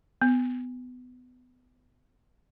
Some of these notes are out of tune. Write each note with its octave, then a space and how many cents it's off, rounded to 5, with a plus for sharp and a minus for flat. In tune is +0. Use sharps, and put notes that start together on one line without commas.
B3 +25